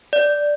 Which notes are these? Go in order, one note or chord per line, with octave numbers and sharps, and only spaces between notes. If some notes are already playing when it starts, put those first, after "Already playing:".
D5